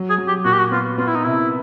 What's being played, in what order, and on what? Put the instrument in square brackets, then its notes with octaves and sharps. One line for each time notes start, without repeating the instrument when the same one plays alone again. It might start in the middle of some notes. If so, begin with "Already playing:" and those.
Already playing: [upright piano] F#3
[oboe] G#4
[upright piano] F#3
[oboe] G4
[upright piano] A#2 [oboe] F#4
[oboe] G4
F#4
[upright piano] B3 [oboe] F4
[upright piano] B3 [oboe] F4
[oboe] E4
D#4
[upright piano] C3 [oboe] E4